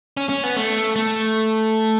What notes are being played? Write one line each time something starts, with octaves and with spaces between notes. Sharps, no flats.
C#4
C#4
B3
A3
A3